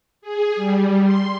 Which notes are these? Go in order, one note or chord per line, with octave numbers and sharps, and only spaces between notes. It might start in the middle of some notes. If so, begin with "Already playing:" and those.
G#4
G3
C6